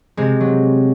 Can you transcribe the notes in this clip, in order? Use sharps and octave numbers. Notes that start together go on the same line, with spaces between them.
C3 G#3 C4
F#3